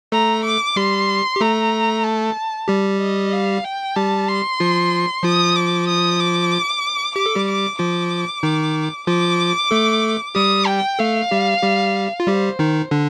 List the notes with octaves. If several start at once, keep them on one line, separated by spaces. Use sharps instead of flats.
A3 A4 A#5
D6
G3 G4 C6
G4
A3 A4 A#5
A5
G3 G4
D#5
F5
G5
G3 G4 A5
C6
F3 F4
F3 F4 D#6
D6
D#6
D6
G4 D6
A4
G3 G4
D6
F3 F4 D6
D#3 D#4
F3 F4 D6
A3 A4
G3 G4 D#6
G5
A3 A4 F5
G3 G4
G3 G4
F4
G3 G4 C5
D#3 D#4
D3 D4